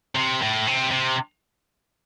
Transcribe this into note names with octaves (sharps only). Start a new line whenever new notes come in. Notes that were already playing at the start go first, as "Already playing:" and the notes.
C3
A2
C3
C3